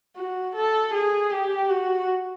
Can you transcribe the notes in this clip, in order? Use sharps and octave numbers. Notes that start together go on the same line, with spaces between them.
F#4
A4
G#4
G4
F#4